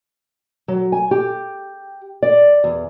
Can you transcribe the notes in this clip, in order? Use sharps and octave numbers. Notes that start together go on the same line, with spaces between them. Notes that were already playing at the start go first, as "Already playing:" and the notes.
F#3
G#5
G4
D5
E2